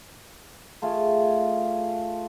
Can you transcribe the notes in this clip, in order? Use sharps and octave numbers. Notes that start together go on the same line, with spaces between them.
A3 F4 G#4